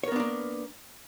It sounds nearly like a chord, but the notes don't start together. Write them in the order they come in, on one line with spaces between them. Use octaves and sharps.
C#5 A#4 B3 D4 A#3